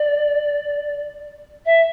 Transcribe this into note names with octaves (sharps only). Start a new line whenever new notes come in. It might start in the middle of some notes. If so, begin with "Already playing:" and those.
Already playing: D5
E5